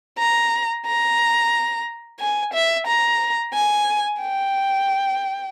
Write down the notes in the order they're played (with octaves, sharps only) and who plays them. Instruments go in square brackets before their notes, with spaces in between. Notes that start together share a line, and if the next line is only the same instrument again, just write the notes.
[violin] A#5
A#5
G#5
E5
A#5
G#5
G5